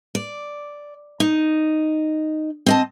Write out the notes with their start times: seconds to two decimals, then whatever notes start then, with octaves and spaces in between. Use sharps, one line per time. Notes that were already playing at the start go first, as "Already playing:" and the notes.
0.15 D5
1.20 D#4
2.66 C4 D#5 A5